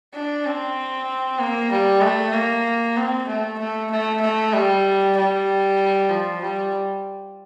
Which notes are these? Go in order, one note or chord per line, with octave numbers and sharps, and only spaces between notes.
D4
C4
A#3
G3
A3
A#3
C4
A3
A3
A3
A3
G3
G3
F3
G3